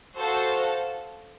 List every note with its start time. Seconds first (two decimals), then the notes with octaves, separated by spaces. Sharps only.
0.17 F#4 A4 C5 F5 A5